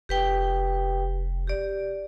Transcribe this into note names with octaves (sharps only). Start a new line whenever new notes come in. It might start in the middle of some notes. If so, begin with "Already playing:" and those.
F1 G4 B4 G5
G4 D5